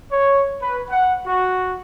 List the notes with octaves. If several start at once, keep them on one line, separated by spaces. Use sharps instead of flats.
C#5
B4
F#5
F#4